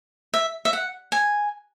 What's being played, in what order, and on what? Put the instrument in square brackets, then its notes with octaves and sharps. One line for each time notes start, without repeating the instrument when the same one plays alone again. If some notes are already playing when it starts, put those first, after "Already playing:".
[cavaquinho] E5
E5
F#5
G#5